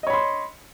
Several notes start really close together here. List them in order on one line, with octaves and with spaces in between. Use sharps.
D#5 C#5 B5 C6